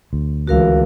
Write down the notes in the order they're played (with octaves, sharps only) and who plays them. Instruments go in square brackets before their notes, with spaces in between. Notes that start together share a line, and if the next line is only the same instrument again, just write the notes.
[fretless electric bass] D2
[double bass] C#2 E3 [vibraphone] F#4 A#4 F5